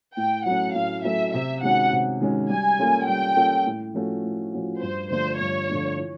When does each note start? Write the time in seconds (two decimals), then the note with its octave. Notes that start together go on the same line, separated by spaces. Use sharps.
0.17 A2 G5
0.46 F#3 A3 C#4 F#5
0.75 A2 F5
1.04 F#3 A3 C#4 E5
1.33 C3 E5
1.63 D#3 G#3 C#4 F#4 F#5
1.92 C3
2.21 D#3 G#3 C#4 F#4
2.50 G3 G#5
2.79 A#3 C#4 F4 A4
3.07 G3 G5
3.36 A#3 C#4 F4 A4
3.66 A2
3.94 F3 A3 C#4 F#4
4.23 A2
4.52 F3 A3 C#4 F#4
4.81 G2 C5
5.10 D3 F3 A3 D4 C5
5.39 G2 C#5
5.69 D3 F3 A3 D4
5.98 E3